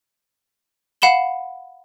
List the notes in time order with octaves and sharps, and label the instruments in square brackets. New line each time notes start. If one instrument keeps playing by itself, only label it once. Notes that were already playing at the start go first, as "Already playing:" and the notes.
[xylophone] F5 F#5 B5 E7 G7